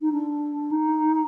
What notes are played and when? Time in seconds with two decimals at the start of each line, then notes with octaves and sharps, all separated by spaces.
0.01 D#4
0.11 D4
0.71 D#4